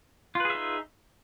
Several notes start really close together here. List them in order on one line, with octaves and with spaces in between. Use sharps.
F4 B4 G#4 E5 D#4